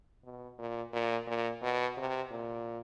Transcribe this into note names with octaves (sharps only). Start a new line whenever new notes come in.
B2
A#2
A#2
A#2
B2
C3
A#2